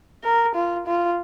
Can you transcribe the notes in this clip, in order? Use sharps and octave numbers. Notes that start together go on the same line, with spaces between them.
A#4
F4
F4